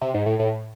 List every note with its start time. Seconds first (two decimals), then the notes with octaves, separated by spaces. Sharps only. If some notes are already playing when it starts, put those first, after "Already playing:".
0.01 C3
0.14 G#2
0.26 A2
0.39 A2